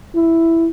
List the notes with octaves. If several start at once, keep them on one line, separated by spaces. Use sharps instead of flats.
E4